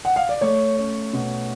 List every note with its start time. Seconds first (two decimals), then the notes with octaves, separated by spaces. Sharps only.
0.05 F#5
0.16 F5
0.29 D5
0.41 A3 C#5
0.77 C#4
1.13 B2